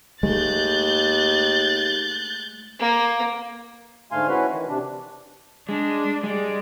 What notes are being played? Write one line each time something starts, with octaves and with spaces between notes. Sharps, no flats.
D#2 G#3 A3 F#6 G6 A6
A#3
G#2 D3 A3 F5 G#5 C6
C#4 E4 F#4 B4
D#3 E3
C3 D4
G#3 D4
G3 G#3 D5